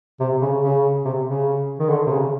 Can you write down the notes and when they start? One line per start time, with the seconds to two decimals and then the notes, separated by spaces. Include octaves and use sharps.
0.20 C3
0.42 C#3
0.63 C#3
1.05 C3
1.27 C#3
1.79 D#3
1.89 D3
2.07 C3
2.11 C#3